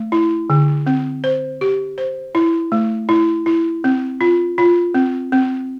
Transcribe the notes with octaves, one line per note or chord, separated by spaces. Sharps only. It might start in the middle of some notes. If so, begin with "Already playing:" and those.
Already playing: A3
E4
D3
C4
C5
G4
C5
E4
A3
E4
E4
C4
F4
F4
C4
C4